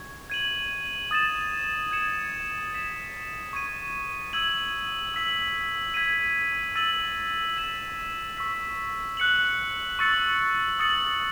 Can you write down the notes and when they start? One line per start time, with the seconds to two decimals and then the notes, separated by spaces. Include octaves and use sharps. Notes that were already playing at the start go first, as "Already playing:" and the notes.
Already playing: C#6 G#6
0.30 G#6 D#7 F#7
1.11 D#6 A6 E7
1.91 G#6 C#7 E7
2.71 G#6 B6 E7
3.53 C#6 G#6 D#7
4.33 E6 G#6 D#7 F#7
5.14 E6 B6 F#7
5.94 G#6 B6 D#7
6.75 E6 A6 D#7 F#7
7.57 G#6 B6 E7
8.37 C#6 E6 B6
9.17 F#6 C#7 F#7
9.99 C#6 E6 A6 C#7 F#7
10.79 D#6 A6 C#7 F#7